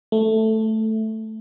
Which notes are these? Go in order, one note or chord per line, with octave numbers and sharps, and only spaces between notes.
A3